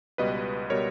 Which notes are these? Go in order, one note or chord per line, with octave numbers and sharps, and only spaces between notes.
C#2 B2 G3 B4 D#5
B2 G3 A#4 C#5